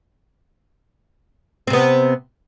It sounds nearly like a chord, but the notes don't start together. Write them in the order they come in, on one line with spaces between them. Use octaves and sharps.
C4 C3 B3